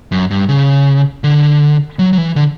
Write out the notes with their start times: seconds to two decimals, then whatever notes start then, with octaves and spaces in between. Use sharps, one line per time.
0.12 F#2
0.31 G2
0.49 C#3
1.24 D3
1.99 F#3
2.13 F#3
2.18 E3
2.36 D3